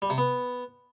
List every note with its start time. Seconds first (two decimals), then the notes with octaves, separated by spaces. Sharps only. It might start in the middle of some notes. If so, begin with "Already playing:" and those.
0.02 G3
0.10 C3
0.18 B3